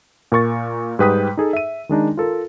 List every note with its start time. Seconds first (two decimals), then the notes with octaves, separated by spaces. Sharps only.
0.32 A#2 A#4 C#6 A6
0.99 G#2 G3 B4 G5 D#6 B6
1.37 D#4 G#4 A4
1.53 E5 D#7
1.89 D#3 G#3 D4 D#4
2.17 F4 A4 A#4